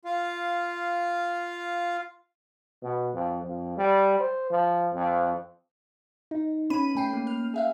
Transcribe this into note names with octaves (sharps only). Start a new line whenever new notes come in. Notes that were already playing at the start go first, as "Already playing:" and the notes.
F4 F5
B2
F2
F2
G3
C5
F3
F2
D#4
B3 C#4 B5 D#7
A3 G5 C7
A#3
F6
G#4 E5 F5